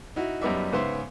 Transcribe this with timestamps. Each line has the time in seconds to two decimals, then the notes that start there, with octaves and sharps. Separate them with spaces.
0.16 D#4 E4 F#4
0.41 F#2 G3 B3 D#4 D5 E5
0.72 G#2 C#3 B3 B4 C5 E5